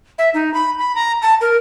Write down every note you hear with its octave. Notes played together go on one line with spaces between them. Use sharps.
E5
D#4
B5
B5
A#5
A5
A#4